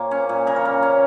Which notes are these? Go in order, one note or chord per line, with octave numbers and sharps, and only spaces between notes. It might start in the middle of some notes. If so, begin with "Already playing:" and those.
Already playing: A#2 A#3 C#5
C#4
A#2
C#3 A#4
C#5
A#3 A#4
C#4